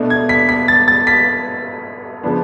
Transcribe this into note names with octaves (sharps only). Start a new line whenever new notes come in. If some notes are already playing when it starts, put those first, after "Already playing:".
Already playing: B2 A3 D4
G#6
B6
B6
A6
A6
B6
C#3 F3 B3 D4